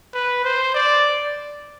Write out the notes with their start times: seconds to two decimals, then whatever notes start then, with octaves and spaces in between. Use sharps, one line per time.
0.14 B4
0.44 C5
0.74 D5